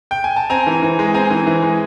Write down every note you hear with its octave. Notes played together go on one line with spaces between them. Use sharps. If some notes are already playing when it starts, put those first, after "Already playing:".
G5
G#5
A5
C4 G#5 A#5
E3
E3
G#3
C4 G#5 A#5
E3
E3
G#3